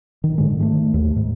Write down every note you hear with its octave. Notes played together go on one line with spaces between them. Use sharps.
D#3
G#2 D3 G#3
D#3 G#3 A3
D#2
G#2